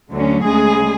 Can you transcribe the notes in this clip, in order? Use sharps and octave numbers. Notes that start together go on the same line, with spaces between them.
D2 D3 F#3 C#4
D2 C#3 G#3 G#4